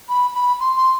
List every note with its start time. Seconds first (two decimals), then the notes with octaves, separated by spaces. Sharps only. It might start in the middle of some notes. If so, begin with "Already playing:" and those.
0.09 B5
0.35 B5
0.60 C6
0.77 C6